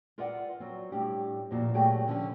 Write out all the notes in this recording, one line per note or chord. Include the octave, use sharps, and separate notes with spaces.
F4 A#4 B4 D5 E5 F#5
F#3 C4
A2 G3 D4 G4
F2 A#2 A#3 C4 F4 F#4
A#2 F#3 A3 G4 G#4 G5
D3 F3 C#4